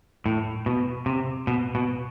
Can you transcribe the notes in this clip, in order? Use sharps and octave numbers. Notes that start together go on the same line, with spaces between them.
A2
B2
C3
B2
B2